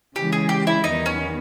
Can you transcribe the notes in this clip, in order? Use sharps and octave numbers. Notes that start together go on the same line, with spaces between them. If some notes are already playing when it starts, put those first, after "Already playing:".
C#3 E3 G#3 G4
G#4
G4
E4
E2 D#3 G3 B3 D#4
C#4